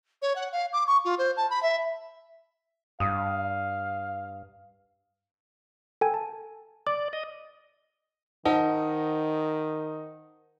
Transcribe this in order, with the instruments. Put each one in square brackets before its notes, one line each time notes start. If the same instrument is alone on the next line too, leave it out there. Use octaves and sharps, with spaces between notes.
[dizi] C#5
F#5
F5
D6
C#6
F4
C5
A5
B5
E5
[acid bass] G2 [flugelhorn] F5 [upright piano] D#6
[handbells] A4 G5 G#5
A5
[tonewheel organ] D5 [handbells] D6
[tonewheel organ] D#5
[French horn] D#3 [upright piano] D#4 [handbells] C5 F#5 A5